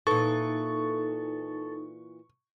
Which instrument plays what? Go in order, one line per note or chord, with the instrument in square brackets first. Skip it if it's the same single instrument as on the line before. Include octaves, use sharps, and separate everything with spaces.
[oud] A#2 E3 [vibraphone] D#4 [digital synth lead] A4 [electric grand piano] C#6